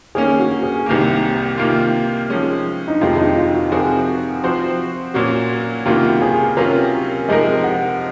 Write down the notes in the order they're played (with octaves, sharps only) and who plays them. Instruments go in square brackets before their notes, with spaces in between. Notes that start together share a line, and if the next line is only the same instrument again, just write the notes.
[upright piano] D#3 A#3 C#4 [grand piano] G#4
[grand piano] F#4
G#4
[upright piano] C2 C3 D#3 A#3
C3 D#3 A#3 F4
F3 G#3 C#4
[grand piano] D#4
[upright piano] F2 C3 D#3 G#3 [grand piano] F4
[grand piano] D#4
F4
F#4
[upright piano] C3 F3 C4 F#4 A#4 [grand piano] G#4
[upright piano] F3 C4 F#4 C5
A#2 F#3 A#3 C#4 F#4
[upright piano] C#2 C3 D#3 A#3 F4 [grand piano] F#4
[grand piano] G#4
[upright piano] C3 F#3 C#4 F4 [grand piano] A#4
[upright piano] C3 F3 G#3 D#4 A#4 [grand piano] D#5
[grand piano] F#5